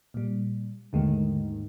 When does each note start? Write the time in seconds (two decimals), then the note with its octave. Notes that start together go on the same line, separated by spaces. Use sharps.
0.14 A#2 G3
0.93 D#2 G#2 D3 D#3 G#3 A3